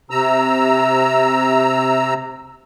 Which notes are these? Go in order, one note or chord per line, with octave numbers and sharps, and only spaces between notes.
C3 A#5 E6